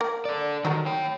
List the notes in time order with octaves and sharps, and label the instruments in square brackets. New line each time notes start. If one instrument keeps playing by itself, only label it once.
[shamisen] A#3 A#4
[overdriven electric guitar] A4 D5
[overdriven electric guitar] D#3 [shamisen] F#3 G3 A#4
[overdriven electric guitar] C#5 G5